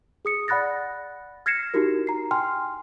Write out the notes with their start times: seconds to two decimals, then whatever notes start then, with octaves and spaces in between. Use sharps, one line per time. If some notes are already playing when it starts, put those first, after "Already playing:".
0.25 G#4 D#6 C#7
0.48 D5 F#5 B5 F#6 A6 A#6
1.46 F6 G#6 A#6 C7 C#7 E7
1.74 D#4 E4 F#4 G4 A#4
2.07 A#5 C7
2.31 G5 G#5 C6 F6